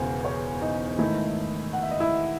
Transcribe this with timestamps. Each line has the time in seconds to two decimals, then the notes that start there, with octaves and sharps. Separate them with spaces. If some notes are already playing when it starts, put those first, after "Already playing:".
Already playing: E1 E2 C#3 C5
0.25 C#5
0.62 D#4 D#5
0.88 D#5
0.99 G#2 D#3 A3 D#4 E4 E5
1.73 F#5
1.82 E5
1.91 D#5
2.00 E4 E5